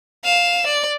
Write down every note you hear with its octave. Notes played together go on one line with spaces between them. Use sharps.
F5 E7
D5